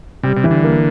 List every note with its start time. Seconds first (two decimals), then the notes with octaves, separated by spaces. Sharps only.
0.23 C3 G3
0.37 C3
0.44 E3
0.51 D3
0.64 A#3